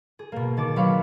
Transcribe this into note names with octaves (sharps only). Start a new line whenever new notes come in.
G#4
B2 A#3
D#3 A5 D6
F#3 C4 B4 F5 C#6